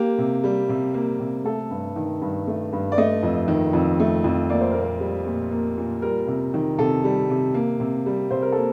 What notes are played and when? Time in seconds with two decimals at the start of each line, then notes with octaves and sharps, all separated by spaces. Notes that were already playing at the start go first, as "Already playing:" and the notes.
Already playing: A#3 G4
0.18 C3
0.44 G3
0.69 C3
0.94 A#3
1.20 C3
1.44 A3 A4
1.71 G2
1.96 D#3
2.21 G2
2.47 A3
2.73 G2
2.92 D5
2.98 A3 D#5
3.23 F2
3.48 D#3
3.73 F2
4.00 A3
4.24 F2
4.50 A#3 D5
4.61 C5
4.72 A#2 A#4
4.82 C5
5.00 G3
5.26 A#2
5.51 A#3
5.78 A#2
6.02 G3 A#4
6.27 C3
6.54 D#3
6.78 C3 A4
7.04 G3
7.30 C3
7.54 A#3
7.80 C3
8.06 G3
8.31 C3 C5
8.42 A#4
8.52 A#3 A4